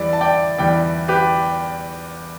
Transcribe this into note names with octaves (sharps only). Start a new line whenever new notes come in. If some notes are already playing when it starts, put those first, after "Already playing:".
Already playing: E2 E3 G3 D5
A5
D5 G5
E2 E3 G3 D5 G5
G4 B4